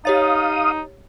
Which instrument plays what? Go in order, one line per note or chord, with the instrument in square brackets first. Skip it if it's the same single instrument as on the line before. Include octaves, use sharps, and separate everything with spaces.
[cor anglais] D#4 [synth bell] G4 C#5 A6 [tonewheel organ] F5 D#6